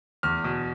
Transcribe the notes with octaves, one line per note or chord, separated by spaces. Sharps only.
E2 F6
B2